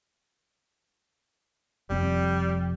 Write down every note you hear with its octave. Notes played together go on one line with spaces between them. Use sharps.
F1 F2 G3 C4